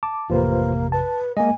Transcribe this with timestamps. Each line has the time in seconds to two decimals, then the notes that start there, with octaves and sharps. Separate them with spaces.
0.03 A5 D6
0.30 A1 F2 C3 A#3 F4 B4 C5
0.92 B4 A5
1.37 G#3 A#3 D#5 G#5